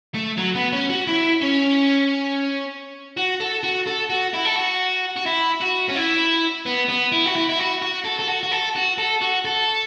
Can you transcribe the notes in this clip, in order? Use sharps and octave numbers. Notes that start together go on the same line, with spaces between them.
A3
F#3
B3
C#4
F#4
E4
C#4
F#4
A4
F#4
A4
F#4
E4
A4
F#4
F#4
E4
F#4
C#4
E4
B3
B3
E4
F#4
E4
E4
F#4
F#4
A4
A4
F#4
F#4
A4
F#4
A4
F#4
A4